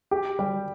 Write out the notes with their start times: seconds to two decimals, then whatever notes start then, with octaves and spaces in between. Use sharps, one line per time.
0.11 G4
0.39 G3